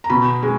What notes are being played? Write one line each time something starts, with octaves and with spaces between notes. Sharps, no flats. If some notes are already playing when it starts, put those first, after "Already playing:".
A#5
B2 B5
G#3